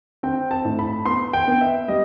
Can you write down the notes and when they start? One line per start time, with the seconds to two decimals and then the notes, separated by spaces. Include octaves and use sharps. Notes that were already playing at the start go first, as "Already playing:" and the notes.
0.23 C4 G5
0.51 A5
0.65 A2
0.79 B5
1.06 B3 C6
1.33 G5
1.47 B3
1.61 E5
1.88 G3 D#5